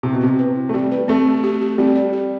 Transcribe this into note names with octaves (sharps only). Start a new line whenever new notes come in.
C3 E4
B2
C3 C4
B4
E4
A3
G3 C4
B4
A3 C4
C4
G4
G4
G3 C4
D5
G4